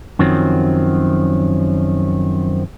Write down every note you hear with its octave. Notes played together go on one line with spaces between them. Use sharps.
F#2 D#3 F3 F#3 C4